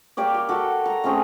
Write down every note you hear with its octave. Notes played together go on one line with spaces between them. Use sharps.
A#3 G4 C#5 D5
G4
F#4 A4
A#5
A3 C4 C#4 G#4